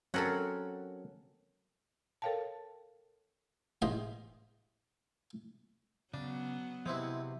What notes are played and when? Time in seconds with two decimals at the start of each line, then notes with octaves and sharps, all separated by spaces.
0.14 F#3 C4 C#4 A4 A#4 F#5
2.22 A4 A#4 C#5 F5 G5 A5
3.82 A1 G#2 C5 D#5 B5 C6
6.14 C#3 F#3 B3 D4
6.86 C3 F3 G#3 C4 E4 F#4 B4